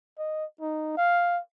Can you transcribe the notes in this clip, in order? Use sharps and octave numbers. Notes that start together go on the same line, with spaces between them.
D#5
D#4
F5